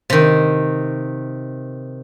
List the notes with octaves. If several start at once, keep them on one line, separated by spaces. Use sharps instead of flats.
C3 D#3